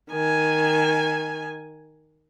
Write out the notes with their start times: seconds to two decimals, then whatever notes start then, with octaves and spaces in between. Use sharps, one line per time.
0.12 D#3 G#5